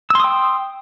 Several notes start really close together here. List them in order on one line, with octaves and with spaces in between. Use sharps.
E6 C6 D#6 G5